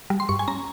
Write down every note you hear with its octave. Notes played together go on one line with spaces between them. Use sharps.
G3
C6
G2 C#6
G#5
C#4 A#5